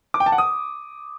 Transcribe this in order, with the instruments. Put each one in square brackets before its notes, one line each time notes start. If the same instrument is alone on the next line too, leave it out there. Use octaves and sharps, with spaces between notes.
[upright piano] D6
G5
A5
F#5
D#6